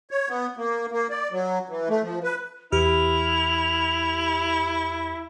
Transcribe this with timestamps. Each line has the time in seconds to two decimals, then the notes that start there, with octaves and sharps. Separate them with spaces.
0.11 C#5
0.29 B3
0.57 A#3
0.92 A#3
1.10 D5
1.32 F#3
1.69 E3
1.89 A3
2.02 F3
2.24 B4
2.72 E2 E4 G4 F6 F7